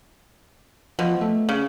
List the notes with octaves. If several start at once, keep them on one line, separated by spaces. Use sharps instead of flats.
B2 F3
A3
C#3